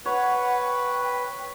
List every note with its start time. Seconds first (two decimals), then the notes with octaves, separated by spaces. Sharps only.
0.05 B4 C#5 F#5
0.64 G5